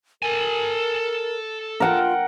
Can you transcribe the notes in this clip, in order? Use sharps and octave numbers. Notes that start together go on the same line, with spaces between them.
A4 A#4 G#5
F4 A#4 F#5 G5